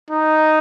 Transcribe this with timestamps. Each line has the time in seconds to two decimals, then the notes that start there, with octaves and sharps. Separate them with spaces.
0.10 D#4